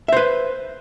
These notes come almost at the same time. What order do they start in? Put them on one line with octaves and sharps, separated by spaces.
E5 C5 B4